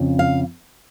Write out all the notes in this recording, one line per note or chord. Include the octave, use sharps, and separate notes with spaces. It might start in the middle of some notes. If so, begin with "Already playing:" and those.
Already playing: F2 C#3
F5